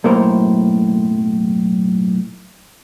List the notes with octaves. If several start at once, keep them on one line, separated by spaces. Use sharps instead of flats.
B1 F#2 A2 A#3 A#4 C5